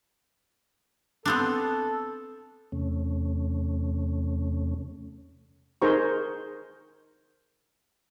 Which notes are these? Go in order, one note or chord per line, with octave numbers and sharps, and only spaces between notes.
B3 C4 D4 A4
E2 C3 A3 C#4
D#4 G#4 A#4 C5 A#5 C#6